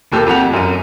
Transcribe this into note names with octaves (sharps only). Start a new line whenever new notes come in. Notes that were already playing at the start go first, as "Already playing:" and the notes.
E1 D#2 G4 A4
F2 G4 F#5 F7
F#2 D#7